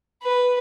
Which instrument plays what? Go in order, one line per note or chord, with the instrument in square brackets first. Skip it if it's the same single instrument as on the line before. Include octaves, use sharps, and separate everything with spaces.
[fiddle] B4